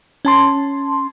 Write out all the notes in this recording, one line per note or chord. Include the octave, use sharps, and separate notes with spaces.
C#4 A5 C6